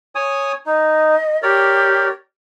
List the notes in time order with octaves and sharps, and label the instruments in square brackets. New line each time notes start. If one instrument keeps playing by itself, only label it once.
[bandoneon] C#5 G#5 D#6
[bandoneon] D#4 [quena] D#5
[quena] G4 [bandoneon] A#4 C#5 D5